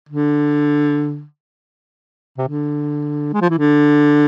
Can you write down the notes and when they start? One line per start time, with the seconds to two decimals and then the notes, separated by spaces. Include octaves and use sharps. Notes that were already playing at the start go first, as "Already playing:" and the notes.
0.09 D3
2.38 C3
2.48 D3
3.33 G#3
3.41 F3
3.50 E3
3.58 D3